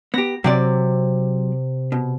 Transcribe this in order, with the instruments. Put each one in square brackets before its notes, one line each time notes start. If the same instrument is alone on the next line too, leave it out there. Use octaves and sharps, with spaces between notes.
[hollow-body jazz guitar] B3 G4 [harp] A#6
[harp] C3 [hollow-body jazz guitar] F#3 C4 D5
[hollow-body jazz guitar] B2